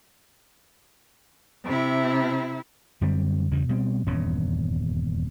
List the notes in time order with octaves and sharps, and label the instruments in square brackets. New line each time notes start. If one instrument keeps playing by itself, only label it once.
[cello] C3 E4
[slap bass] F#2 D3 G3 C4
E2 G2 C#3
B2 G3 C4
D#1 E2 G2 C#4